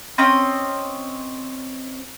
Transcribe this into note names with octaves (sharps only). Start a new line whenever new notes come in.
C4 C#4 D#5